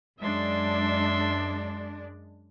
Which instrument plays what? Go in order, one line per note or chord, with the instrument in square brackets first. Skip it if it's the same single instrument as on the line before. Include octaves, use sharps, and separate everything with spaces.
[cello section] F#2 G#3 D4 [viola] E5 C6